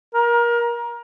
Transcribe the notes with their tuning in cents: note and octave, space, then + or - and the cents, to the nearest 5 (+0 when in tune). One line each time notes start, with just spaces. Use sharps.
A#4 +25